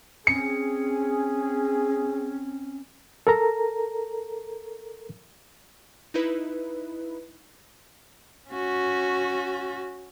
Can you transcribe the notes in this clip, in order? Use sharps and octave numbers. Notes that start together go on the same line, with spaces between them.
C4 C#4 G#4 C#7
A4 A#4 A#5
D#4 E4 B4
C#4 F#4